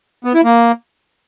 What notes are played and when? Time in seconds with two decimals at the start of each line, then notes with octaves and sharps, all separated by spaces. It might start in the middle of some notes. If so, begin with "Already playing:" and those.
0.25 B3
0.34 E4
0.44 A#3